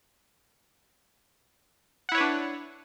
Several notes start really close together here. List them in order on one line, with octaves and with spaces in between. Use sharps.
F#5 E4 C#5 B4 D4